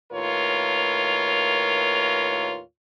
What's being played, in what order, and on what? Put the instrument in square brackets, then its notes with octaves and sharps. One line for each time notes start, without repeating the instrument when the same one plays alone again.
[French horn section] D#2 A2 F4 A#4 B4 C#5